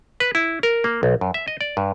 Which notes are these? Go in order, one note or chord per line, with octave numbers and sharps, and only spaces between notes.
B4
E4
A#4
A#3
B1
F#2
E5
D#5
D5
G2